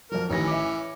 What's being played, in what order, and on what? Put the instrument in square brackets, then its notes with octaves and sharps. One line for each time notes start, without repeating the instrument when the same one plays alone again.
[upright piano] F2 F#3 [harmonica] A#4
[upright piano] A1 D#3 A#6 [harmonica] E3 C#4
[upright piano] E5 D6